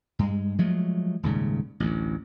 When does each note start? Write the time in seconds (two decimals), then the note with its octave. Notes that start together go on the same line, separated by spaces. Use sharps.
0.19 G2 G#3
0.58 F3 F#3 G#3 A3
1.23 D#1 G#2 C#3
1.80 A1 D2